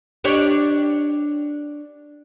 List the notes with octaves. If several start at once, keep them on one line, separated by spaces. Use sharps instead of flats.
D4 G4 C#5